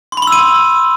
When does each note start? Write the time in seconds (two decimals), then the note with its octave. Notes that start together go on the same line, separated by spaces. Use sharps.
0.12 C6
0.17 B5
0.22 C6
0.27 E6
0.32 D#7